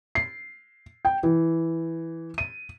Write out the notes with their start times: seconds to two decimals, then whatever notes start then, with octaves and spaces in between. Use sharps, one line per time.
0.15 C7
1.05 G5
1.23 E3
2.38 D#7